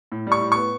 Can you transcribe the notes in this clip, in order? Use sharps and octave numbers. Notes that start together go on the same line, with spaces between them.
A2
G3 C#6
A2
B3 C#6